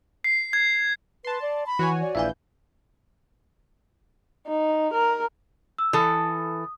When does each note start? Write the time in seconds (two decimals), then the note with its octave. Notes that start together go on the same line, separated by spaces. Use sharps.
0.24 C7
0.53 G#6
1.25 B4 A5 C6
1.41 D5
1.66 B5
1.79 E3 F#4 C#5 G#5
2.01 D5
2.15 A#1 E3 E5 F5 G#5 G6
4.48 D#4
4.94 A#4
5.78 E6
5.93 E3 A4 D#6